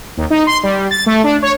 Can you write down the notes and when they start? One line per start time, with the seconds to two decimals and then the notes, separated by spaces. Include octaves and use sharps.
0.17 D#2
0.30 D#4
0.47 C6
0.63 G3
0.91 A6
1.06 A3
1.24 D4
1.42 C#5